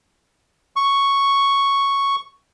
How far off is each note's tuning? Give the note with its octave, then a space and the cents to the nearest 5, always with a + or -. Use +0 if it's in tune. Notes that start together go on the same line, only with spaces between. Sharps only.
C#6 +0